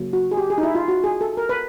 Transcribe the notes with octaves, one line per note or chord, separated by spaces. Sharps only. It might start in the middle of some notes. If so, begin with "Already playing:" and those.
Already playing: C#3 F#3 A#3
F#4
G#4
G4
G#4
D#4
E4
F4
F#4
G#4
A4
A#4
B4